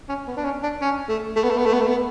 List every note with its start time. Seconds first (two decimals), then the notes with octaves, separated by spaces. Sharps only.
0.08 C#4
0.27 B3
0.37 D4
0.45 C#4
0.63 D4
0.81 C#4
1.09 A3
1.36 A3
1.43 B3
1.50 A3
1.58 B3
1.66 A3
1.73 B3
1.81 A3
1.88 B3